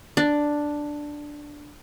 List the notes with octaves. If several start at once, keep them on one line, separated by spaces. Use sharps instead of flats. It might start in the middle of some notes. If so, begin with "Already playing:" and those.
D4